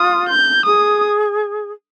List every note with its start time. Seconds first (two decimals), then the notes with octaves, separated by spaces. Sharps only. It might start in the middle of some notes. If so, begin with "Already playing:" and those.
Already playing: F4 D#6
0.29 G6
0.65 G#4 D#6